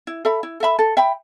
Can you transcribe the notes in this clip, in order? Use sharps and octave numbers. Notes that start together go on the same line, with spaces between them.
E4
A4 E5 B5
E4
A4 E5 B5
A4
E5 G5 B5